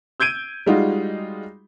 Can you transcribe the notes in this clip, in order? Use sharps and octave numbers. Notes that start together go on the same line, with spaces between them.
E6 G6 G#6 D7 D#7
G3 G#3 D#4 F4 F#4